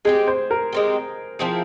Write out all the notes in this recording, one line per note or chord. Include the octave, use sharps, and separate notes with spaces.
G#3 C4 G4 G#4
C5
A#4
G#3 C4 G4
F3 C4 E4 G#4